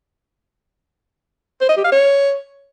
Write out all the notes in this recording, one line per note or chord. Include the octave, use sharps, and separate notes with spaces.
C5
D#5
G4
F5
C#5